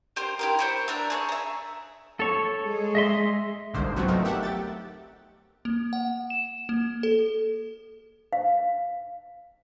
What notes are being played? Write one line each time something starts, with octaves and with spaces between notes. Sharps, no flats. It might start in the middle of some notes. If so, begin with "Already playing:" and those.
G4 A#4 C5
E4 G4 A#4
C5 C#5 B5
D4 A#4 E5
G#4 C5 C#5
E5 A#5
A4 C#5
G#3 G#4
D#5 E5 C6
G1 C2 G#2 D3 A#3 C5
F3 F#3 B3 C4 F#4
A3 D#4 A#4
G4 E5 F#5
G5 A6
A#3
F#5
E7
A#3
A4
F5